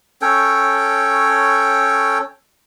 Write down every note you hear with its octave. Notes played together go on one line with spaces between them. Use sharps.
C#4 A4 C#5 G5